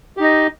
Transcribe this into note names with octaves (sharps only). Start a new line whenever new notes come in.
D#4 G4 D#5